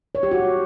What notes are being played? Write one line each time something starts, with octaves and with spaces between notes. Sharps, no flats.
C#5
G4
F#4